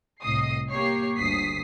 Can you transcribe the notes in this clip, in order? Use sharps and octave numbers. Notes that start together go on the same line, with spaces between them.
C2 A2 D#5 D#6 C7
A#3 G4 C#5 C7
G1 D2 D#6 B6 C7